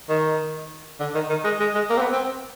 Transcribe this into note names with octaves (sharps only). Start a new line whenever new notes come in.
D#3
D3
D#3
D#3
G#3
G#3
G#3
A#3
C4
B3
C4